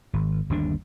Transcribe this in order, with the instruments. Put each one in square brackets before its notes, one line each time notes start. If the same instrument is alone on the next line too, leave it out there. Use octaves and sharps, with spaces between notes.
[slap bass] G#1
G1 D#2 D4